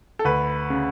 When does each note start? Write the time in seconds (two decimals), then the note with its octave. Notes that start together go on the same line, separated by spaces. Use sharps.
0.19 A4
0.25 D2 B4
0.70 C#3